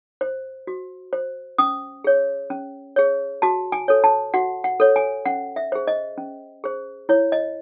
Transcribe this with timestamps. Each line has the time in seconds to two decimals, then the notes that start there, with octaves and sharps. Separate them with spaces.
0.21 C5
0.67 F#4
1.13 C5
1.58 C#4 D#6
2.04 G#4 C#5
2.50 C#4
2.96 G#4 C#5
3.42 F#4 A5
3.72 G#5
3.88 A4 C#5
4.04 A5
4.34 F#4 F#5
4.64 F#5
4.80 A4 C#5
4.96 G#5
5.26 C#4 F#5
5.56 E5
5.72 G#4 C5
5.87 D#5
6.18 C#4
6.64 G#4 C5
7.09 E4 C#5
7.32 D#5